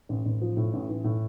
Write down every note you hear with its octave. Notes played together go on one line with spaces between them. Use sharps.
A1
A1
F3
A2
A1
E3
A2